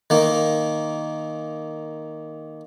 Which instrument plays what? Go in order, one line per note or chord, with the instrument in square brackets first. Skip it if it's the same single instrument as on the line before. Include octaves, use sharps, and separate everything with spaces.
[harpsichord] D#3 A#3